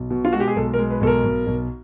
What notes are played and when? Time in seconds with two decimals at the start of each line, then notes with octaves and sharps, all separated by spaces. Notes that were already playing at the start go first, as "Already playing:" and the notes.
Already playing: B1
0.10 B2
0.25 F4
0.33 G#3 F#4
0.40 G4
0.47 G#4
0.56 B1 A4
0.74 A#4
0.78 G#3
0.90 B4
1.01 B1 A4
1.07 A#4
1.24 B1
1.47 B1